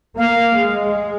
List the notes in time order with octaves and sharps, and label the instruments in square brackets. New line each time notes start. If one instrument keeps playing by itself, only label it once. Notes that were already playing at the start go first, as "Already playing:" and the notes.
[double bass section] A#3 [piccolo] F5
[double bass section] G#3